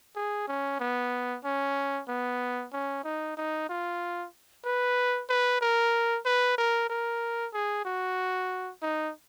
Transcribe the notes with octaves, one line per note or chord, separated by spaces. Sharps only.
G#4
C#4
B3
C#4
B3
C#4
D#4
D#4
F4
B4
B4
A#4
B4
A#4
A#4
G#4
F#4
D#4